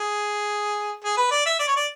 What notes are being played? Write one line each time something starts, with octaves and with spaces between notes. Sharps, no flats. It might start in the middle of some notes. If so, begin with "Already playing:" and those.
Already playing: G#4
G#4
B4
D5
E5
D5
C#5
D5